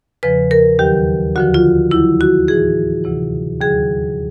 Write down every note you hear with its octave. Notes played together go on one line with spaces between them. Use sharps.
E2 C#3 F3 B4
A#4
D#2 D#3 F#3 G4
D2 D3 F3 F#4
F4
D#2 D#3 F#3 E4
F#4
A2 E3 G#4
D2 C3 E3
D#2 D3 F#3 G#4